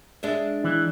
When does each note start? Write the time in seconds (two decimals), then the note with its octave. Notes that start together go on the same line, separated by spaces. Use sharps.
0.23 G#3 D4 E5
0.64 E3